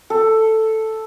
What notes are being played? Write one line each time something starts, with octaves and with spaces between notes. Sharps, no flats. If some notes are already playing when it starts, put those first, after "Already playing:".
A4